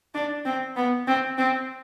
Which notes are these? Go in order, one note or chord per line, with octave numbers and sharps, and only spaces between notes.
D4
C4
B3
C4
C4